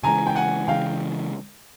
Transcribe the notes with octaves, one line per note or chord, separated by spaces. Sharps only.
C#3 E3 G#3 G#5 A#5
G5
F#5 G#5
C#3 E3 G#3 F5 G5